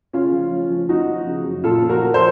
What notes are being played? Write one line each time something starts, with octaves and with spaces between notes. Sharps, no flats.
C#3 C#4 F4
F3
F3
F3
F3 D#4 F#4
F3
C#3
F#2
A#2 F4 A4
F3
F#4 A#4
F3
A4 C5